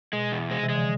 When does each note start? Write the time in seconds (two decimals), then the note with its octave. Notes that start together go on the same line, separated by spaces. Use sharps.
0.13 B2 G#3
0.32 E2
0.50 C3 G#3
0.63 C3 E3
0.69 G#3
0.75 D3 F3